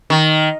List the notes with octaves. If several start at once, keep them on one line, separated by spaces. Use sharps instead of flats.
D#3